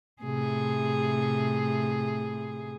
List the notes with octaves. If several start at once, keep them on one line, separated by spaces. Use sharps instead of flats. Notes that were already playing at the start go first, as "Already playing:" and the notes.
A2 C3 G#4